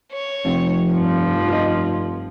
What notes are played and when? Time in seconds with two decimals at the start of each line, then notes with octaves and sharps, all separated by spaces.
0.12 C#5
0.45 F1 F2 C3
0.91 G2 F3
1.49 F4 D#5